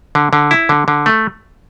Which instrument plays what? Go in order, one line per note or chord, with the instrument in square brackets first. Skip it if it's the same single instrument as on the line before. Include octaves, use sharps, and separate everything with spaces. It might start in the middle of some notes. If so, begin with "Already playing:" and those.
[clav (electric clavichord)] D3
D3
E4
D3
D3
A3